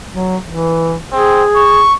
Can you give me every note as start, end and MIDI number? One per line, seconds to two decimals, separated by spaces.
0.11 0.37 54
0.48 0.97 52
1.13 1.43 60
1.13 1.85 68
1.56 1.94 85